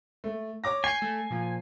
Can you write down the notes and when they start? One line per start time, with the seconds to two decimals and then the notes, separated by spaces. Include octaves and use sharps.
0.24 A3
0.64 C#5 D6 A#6
0.84 G#5 C#6 G6 C7
1.02 A3 A4
1.30 A#2 F3